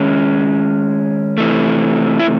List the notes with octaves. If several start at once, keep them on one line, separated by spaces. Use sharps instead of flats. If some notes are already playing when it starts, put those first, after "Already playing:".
Already playing: D#3 G#3 C#4
C3 E3 A3
E4